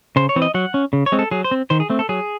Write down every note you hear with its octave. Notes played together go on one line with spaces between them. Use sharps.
C#3 C5
C#5
E3 C4
D#5
F#3 F#5
C#4
C#3
C#5
G#3 C4
A4
F#3 G#4
C5
C4
D#3 C5
G#4
A3 C4
A4
F#3 G#4